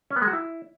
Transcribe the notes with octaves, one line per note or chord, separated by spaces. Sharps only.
C#4
B3
G#3
F#4
E4